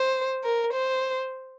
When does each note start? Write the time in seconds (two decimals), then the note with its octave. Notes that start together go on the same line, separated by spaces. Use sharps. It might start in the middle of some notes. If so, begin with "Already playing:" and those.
Already playing: C5
0.44 A#4
0.73 C5